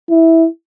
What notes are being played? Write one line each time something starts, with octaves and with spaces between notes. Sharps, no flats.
E4